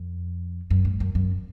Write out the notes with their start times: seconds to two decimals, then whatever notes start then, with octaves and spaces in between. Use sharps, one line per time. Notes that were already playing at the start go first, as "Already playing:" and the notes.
Already playing: F2
0.70 F#2
0.85 G#2
1.00 F#2
1.15 F#2